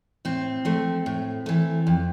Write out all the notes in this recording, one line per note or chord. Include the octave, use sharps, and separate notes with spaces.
A2 C4
F3 A3
A2
E3 A3
F2